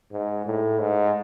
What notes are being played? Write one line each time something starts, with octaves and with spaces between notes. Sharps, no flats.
G#2
A2
G#2